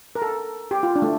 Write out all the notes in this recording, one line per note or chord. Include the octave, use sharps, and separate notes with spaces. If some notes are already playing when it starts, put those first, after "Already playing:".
A#4
A4
G4
F4
D4
A3